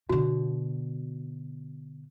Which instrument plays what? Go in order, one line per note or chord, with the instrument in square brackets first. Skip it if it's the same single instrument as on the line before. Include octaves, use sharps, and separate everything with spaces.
[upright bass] B2 D3 [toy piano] F#4